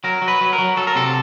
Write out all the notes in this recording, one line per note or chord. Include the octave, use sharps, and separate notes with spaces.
F#3 A#4
F#3
B4
F#3
A#4
F#3
F#3 A4
A#4
C3 A4